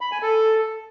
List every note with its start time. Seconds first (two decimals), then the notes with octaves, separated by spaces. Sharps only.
0.01 B5
0.12 G#5
0.22 A4